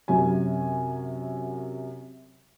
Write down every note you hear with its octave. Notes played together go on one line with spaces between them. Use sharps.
F#2 C3 F#3 G#5